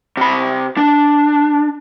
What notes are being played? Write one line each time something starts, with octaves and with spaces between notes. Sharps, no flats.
C3 B5
D4